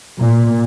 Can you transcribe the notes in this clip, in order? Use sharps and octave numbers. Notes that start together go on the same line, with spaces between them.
A#2